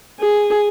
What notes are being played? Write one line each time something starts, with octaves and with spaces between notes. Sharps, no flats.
G#4